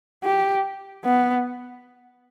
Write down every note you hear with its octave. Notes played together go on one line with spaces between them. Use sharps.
G4
B3